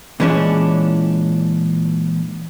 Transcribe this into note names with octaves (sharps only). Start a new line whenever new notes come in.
A#2 E3 G#3 C#4 D4